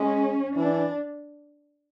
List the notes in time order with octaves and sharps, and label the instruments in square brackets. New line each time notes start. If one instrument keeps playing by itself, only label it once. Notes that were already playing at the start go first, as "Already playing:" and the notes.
Already playing: [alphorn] G#3 [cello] C#4
[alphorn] E3 [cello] D4